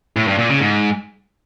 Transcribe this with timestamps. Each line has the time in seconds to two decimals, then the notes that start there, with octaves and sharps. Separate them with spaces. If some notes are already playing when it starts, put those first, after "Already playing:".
0.16 A2
0.28 G2
0.39 A#2
0.50 C#3
0.61 G#2